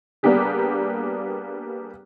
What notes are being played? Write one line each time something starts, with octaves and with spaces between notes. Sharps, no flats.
G3 A#3 B3 D4 G4 G#4